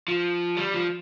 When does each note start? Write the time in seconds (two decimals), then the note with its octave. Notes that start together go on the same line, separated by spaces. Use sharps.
0.08 F3
0.57 G3
0.74 F3